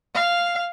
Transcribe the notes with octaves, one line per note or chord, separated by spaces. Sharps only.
F5